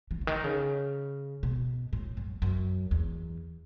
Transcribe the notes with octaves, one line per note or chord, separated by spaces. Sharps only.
E3
C#3
D#3
C#3
B2
A2
F#2
F#2
E2